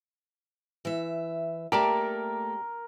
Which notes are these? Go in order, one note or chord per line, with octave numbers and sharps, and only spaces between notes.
E3 E5
A3 A#3 G4 A4 A#4 D5 A5